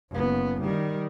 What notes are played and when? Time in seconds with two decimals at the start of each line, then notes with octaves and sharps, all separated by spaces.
0.11 F#1 B3
0.61 D#3 G3